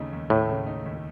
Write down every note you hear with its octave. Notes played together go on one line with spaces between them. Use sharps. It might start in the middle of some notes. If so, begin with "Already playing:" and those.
Already playing: D#2 C#3 A3 D#4
D#2
A2 A3
C#3
D#4
D#2